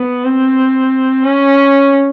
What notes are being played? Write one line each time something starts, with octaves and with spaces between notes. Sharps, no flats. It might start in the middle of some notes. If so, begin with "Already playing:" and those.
Already playing: B3
C4
C#4